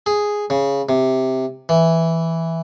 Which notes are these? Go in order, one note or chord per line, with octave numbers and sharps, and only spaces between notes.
G#4
C#3
C3
E3